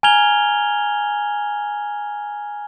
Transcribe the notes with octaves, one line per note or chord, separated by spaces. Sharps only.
G#5 A#5 F6 G#6 F7 G7